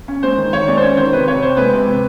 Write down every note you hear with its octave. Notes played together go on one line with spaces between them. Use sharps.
C#4
G#3 C5
D#3
D#3 C#5
G#3 D5
C5
C#4 C#5
D#3 C5
C3 B4
C3 C#5
C3 C5
G#3 B4
C3
C3